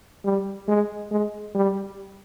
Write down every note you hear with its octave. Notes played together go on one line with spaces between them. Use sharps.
G3
G#3
G#3
G3